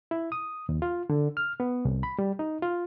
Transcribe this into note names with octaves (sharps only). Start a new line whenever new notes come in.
E4
D#6
D#2
F4
D3
F6
B3
C2
B5
G3
D#4
F4